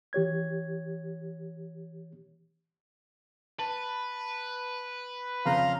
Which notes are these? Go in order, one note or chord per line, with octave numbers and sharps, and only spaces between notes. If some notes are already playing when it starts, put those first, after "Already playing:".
E3 G4 C#5 G#6
B4 A5
F2 C#3 F5 A#5 C6